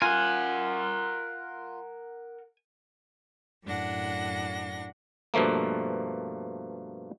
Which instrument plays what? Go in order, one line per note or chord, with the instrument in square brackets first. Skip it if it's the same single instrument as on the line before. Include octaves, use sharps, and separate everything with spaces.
[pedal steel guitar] F4 [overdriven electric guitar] A#4 F#5 [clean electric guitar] G#5
[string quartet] F#2 A2 D4 F#5 A#6
[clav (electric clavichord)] G2 B2 F3 A3 A#3